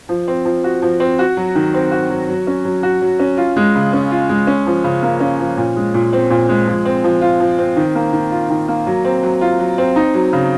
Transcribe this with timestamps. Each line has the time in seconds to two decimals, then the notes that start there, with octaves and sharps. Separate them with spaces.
0.09 F3
0.28 C4
0.45 F3
0.64 F#4
0.82 F3
1.00 C4
1.19 F#4
1.37 F#3
1.55 D#3
1.74 C4
1.91 F#4
2.10 F#3
2.28 F#3
2.47 C#4
2.65 F#3
2.83 F#4
3.01 F#3
3.19 C#4
3.38 F4
3.56 G#3
3.75 C#3
3.93 C#4
4.11 F4
4.29 G#3
4.47 C#4
4.67 F3
4.84 C#3
5.03 A#3
5.20 C#4
5.39 F3
5.57 A#2
5.76 G#3
5.94 A#2
6.13 C4
6.30 A#2
6.49 G#3
6.67 F3
6.85 C4
7.04 F3
7.21 F4
7.40 F3
7.58 C4
7.76 D#3
7.95 A#3
8.13 D#3
8.31 F4
8.50 D#3
8.68 A#3
8.86 F#3
9.04 C4
9.23 F#3
9.41 F4
9.59 F#3
9.78 C4
9.96 D#4
10.14 F#3
10.33 C#3